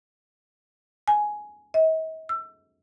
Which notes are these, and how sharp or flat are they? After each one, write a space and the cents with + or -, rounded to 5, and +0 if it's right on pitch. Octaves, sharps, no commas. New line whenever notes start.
G#5 +10
D#5 +45
E6 +25